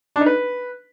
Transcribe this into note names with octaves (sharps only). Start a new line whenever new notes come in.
D4
D#4
B4